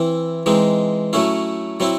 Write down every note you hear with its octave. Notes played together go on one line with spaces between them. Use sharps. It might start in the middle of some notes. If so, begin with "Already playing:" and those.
Already playing: E3 C4 E4
E3 G#3 C4 D#4
F#3 A3 C#4 E4
F#3 C4 E4